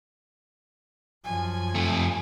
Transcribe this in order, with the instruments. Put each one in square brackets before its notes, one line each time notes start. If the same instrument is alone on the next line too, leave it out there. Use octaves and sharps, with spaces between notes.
[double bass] F#2 F3 [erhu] G#5
[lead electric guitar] F2 A3